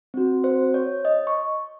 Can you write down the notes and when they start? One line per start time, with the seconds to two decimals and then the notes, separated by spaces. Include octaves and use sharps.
0.14 C4 F#4
0.44 C5
0.74 C#5
1.05 D#5
1.27 C#6